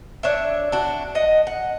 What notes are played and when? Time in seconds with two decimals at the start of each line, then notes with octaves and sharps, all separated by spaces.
0.23 D4 C#5 E5
0.72 D4 F#4
1.15 D#5 F#5
1.47 F#5